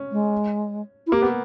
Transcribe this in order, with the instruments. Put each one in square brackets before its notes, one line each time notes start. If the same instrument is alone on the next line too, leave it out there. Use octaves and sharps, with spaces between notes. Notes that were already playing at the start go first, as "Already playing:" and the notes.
Already playing: [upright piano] C#4
[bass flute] G#3
E4
[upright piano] A#3 [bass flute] G4
[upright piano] B3